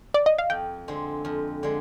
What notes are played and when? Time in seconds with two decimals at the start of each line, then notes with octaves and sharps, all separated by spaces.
0.14 D5
0.26 D#5
0.38 F5
0.50 F2 G5
0.88 D3 G#3 C4
1.25 F2
1.63 D3 G#3